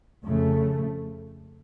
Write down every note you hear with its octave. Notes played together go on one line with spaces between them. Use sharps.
F2 C#3 A3